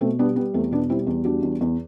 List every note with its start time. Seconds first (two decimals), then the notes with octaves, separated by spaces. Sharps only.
0.01 B2 A3 C4
0.19 G3 B3 D4
0.36 G3 B3
0.54 E2 A3 C4
0.71 B2 B3 D4
0.89 G3 C4 E4
1.07 E2
1.24 G3 D4 F#4
1.43 E2
1.61 E2